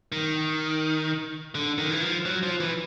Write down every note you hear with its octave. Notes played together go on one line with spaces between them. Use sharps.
D#3
D3
D#3
E3
F3
F#3
F3
E3